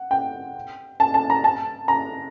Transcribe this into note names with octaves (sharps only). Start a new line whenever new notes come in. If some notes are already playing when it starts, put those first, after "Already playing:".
Already playing: F#5
G5
A5
A5
A#5
A5
A#5